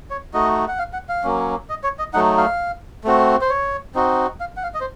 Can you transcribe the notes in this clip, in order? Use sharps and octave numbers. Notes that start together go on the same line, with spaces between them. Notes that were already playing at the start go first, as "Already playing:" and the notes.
C#5
A3 D#4 F#4 D#5
F#5
F5
F#5
F5
F#3 A#3 C#4
D#5
C#5
D#5
F#3 A3 D#4 F#5
F5
A3 C4 F#4
C5
C#5
C4 D#4 F#4
F5
F#5
F5
D#5
C5